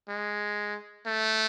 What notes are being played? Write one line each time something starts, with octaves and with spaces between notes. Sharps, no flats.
G#3
A3